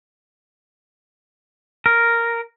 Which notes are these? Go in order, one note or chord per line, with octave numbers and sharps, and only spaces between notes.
A#4